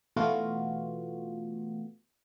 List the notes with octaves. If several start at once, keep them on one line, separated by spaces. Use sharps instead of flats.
B2 E3 A3 B3 F4 F#4